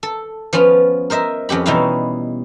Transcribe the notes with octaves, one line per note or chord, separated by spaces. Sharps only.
A4
F3 B3 C#4 F4
A#4 C5 D#5 E5
F2 C#4 G4 B5
B2 E3 G3 D#4 E4 F5